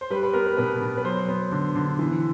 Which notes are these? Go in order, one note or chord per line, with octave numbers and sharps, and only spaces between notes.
C5
G3 B4
B4
B3 A#4
B4
B2 B4
B2
B4
F#3 C5
B3
D3
D3
E3